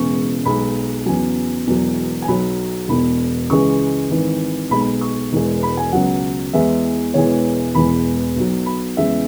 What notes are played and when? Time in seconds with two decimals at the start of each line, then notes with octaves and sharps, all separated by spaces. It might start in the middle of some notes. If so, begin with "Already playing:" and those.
Already playing: E1 E2 C#3 G#3 C#6
0.45 B1 B2 G#3 B5
1.06 E2 C#3 F#3 G#5
1.67 E1 E2 B2 F#3
2.22 G#5
2.28 B1 B2 F#3 B5
2.88 E1 E2 B2 B5
3.50 C#2 C#3 E3 G#3 C#6
4.10 G#1 G#2 E3
4.70 B1 B2 G#3 B5
4.81 B5
5.01 C#6
5.32 E1 E2 E3 G#3
5.63 B5
5.77 G#5
5.92 C#2 B2 F#3 F#5
6.53 E2 E3 G#3 E5
7.14 E1 E2 E3 G#3 C#5
7.75 E1 E2 E3 G#3 B5
8.36 B1 B2 F#3
8.66 B5
8.97 E2 C#3 G#3 E5